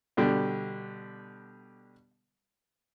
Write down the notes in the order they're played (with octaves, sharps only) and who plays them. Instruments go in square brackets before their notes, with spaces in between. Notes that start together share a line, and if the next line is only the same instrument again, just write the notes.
[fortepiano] B2 D3 G3